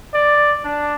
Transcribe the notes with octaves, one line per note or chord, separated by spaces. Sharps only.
D5
D4